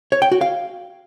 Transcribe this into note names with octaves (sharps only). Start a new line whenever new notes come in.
C#5
G5
F#4
F5